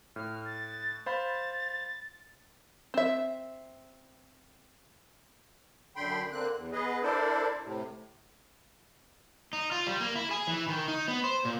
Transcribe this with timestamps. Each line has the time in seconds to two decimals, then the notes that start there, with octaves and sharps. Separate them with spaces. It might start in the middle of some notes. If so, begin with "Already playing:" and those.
0.16 A2 F6
0.45 A6
1.06 C5 F5 B5 A6
2.94 C4 E5
5.96 F#2 D3 G5 B5 C6
6.32 D3 A#3 C4 F#6
6.56 E2
6.72 B3 G#4 B4 D#5
7.03 D4 E4 A4 A#4 C5 D5
7.64 A2 C3
9.53 D#4
9.72 F4
9.87 G3
10.01 A#3
10.15 E4
10.31 G#4
10.47 E3
10.68 D#3
10.88 D#4
11.08 B3
11.24 C5
11.45 A#2